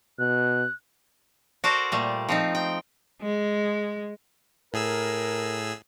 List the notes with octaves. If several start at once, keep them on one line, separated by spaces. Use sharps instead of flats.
B2 F#6
F#4 A4 A#4 C5 D5
A#2 G3 A3
F3 C4 D#4
G5
G#3
A2 G#4 A#4 E6